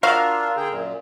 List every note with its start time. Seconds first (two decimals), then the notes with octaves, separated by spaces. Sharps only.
0.03 D4 F4 F#4 A#4 E5 F5
0.57 D3 G#4 G5
0.71 F#2 A#2